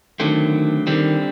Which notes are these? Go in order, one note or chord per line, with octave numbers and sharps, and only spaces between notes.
D3 D#3 F#3 A3 C4
D3 D#3 G3 C4